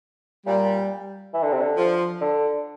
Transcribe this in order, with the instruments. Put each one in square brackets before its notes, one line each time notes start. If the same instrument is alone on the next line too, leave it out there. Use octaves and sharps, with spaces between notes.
[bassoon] A#2 [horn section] G3
[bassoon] E3
D3
C3
D3
[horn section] F3
[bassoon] D3